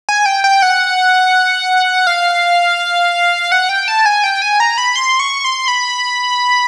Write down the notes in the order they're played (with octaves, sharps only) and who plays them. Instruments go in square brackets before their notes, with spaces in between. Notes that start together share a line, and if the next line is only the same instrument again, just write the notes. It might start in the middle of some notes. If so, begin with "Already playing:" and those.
[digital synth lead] G#5
G5
G5
F#5
F5
F#5
G5
A5
G#5
G5
G#5
A#5
B5
C6
C#6
C6
B5